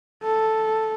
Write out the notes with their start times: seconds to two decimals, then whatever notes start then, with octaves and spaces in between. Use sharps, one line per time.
0.23 A4